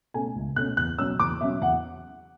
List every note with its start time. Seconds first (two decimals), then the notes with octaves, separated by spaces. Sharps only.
0.14 B2 A3 C#4 G#5
0.35 C#2
0.56 B2 A3 C#4 F#6
0.77 E2 F#6
0.99 B2 F#3 C#4 E6
1.20 E2 D6
1.41 B2 F#3 C#4 E5
1.62 E2 F#5